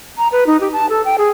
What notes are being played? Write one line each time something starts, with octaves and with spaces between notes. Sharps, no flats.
A#5
B4
D#4
G4
A5
A4
G5
G#4